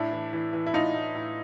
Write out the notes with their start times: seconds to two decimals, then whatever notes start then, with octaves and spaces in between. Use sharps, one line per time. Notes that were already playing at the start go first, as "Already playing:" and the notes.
Already playing: A2 D4 E4
0.12 E3
0.33 E3
0.53 E3
0.66 E4
0.73 A2 D#4 F4
0.94 A2
1.15 A2